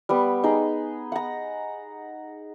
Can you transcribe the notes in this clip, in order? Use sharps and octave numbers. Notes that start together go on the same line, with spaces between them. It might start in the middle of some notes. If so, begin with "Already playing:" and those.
G3 B3
D#4 G#4
F#5 A#5